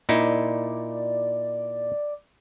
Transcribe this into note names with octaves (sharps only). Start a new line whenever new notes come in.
A#2 D#4 E4 D5